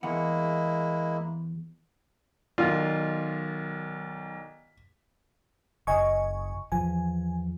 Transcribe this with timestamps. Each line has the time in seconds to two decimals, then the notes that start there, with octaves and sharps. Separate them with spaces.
0.03 E2 G#3 A#3 E4 F#5
2.58 B1 D#3 F4 D5
5.87 F#1 D#5 G#5 C#6
6.72 E2 F3 G#5